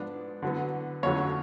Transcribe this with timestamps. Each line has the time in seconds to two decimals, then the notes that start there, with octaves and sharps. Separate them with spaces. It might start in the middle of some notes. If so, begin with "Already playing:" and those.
Already playing: G#2 F3 B3 D4
0.42 D3 F#3 B3
1.03 F2 D3 F#3 A3 C#4 C#5